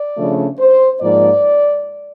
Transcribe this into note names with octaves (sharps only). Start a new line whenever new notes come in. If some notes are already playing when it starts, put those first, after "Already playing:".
Already playing: D5
C#3 F3 A3 D4
C5
G#2 F3 A#3 D5